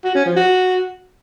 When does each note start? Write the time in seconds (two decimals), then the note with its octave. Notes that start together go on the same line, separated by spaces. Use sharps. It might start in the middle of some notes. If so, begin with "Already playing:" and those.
0.04 F#4
0.15 C#4
0.26 F3
0.36 F#4